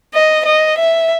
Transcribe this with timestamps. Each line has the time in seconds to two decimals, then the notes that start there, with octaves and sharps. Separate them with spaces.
0.14 D#5
0.46 D#5
0.79 E5